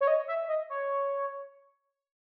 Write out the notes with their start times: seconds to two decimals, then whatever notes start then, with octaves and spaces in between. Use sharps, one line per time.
0.01 C#5
0.07 D#5
0.28 E5
0.48 D#5
0.69 C#5